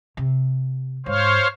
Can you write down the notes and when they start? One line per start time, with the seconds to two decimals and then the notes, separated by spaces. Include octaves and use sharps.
0.17 C3
1.06 G#2 C5 C#5 F5